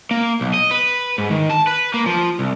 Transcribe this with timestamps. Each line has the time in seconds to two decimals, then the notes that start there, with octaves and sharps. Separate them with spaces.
0.11 A#3
0.41 B1
0.54 D#5
0.71 B4
1.18 G#2
1.31 D#3
1.50 A5
1.67 B4
1.94 A#3
2.06 F3
2.39 C2